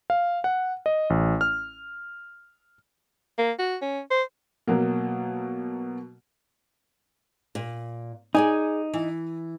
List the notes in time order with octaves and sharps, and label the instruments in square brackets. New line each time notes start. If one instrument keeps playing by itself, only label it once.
[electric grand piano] F5
F#5
D#5
A1
F6
[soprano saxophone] A#3
F#4
C#4
C5
[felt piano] B2 F#3 A#3
[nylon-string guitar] A#2
[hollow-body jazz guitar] D#4 [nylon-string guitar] G#4 D5 G#5
[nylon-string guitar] E3